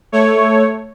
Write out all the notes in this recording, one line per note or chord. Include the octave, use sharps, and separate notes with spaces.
A3 C#5